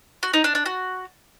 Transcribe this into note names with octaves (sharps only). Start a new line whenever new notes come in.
F#4
D#4
D4
D4
F#4